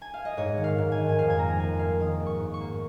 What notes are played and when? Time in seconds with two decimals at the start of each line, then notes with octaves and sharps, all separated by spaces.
0.02 G#5
0.14 F5
0.25 D#5
0.37 G#2 C#5
0.58 D#3
0.64 F5
0.78 G#2
0.92 G#5
0.98 D#3
1.09 G#5
1.19 F2 F5
1.30 G#5
1.38 A#3 A#5
1.59 F2 G#5
1.79 A#3 F5
2.00 D#3 D#6
2.20 G#2
2.26 C#6
2.41 G#2
2.54 C#6
2.61 A#3